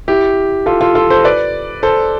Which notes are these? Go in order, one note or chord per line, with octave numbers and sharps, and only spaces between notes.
E4 G4
F4 A4
F4 A4
F4 A4
A4 C5
B4 D5
A4 C5